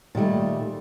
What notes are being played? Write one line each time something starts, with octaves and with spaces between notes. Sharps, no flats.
A#2 D#3 G3 A3